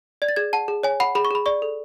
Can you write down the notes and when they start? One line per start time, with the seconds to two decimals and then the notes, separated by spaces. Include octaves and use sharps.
0.22 D5 G#6
0.28 A6
0.36 G#4 G#6
0.53 F#5 A5
0.68 G#4
0.83 C#5 G#5
1.00 F#5 B5
1.15 G#4 B5
1.25 C#6
1.31 G#4 B5
1.46 D5 C#6
1.62 A4